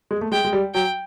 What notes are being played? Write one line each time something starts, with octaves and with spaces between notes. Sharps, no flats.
G#3
A3
G#3 G5
G#3
G3
F#3 G5